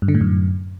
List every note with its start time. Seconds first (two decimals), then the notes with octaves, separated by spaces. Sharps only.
0.02 G2
0.08 D3
0.15 A2
0.21 F#2